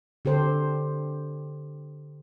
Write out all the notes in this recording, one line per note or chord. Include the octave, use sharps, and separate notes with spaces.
D3 G4 A4 C5